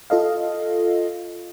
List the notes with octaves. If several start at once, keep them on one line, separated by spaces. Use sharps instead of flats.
F4 A4 D#5 F5